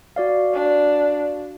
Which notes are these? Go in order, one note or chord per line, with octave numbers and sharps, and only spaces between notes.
F#4 D5 F5
D4